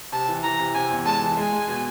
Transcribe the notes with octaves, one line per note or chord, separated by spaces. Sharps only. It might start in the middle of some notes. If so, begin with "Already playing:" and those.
C3 A5
E3
E3 A#5
C3
C3 G#5
E2
G#3 A5
E3
G#3 G#5
G#3
B2